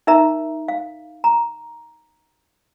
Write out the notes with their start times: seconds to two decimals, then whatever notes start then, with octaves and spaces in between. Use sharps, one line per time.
0.07 D#4 A#4 E5 A#5
0.68 F5
1.24 A#5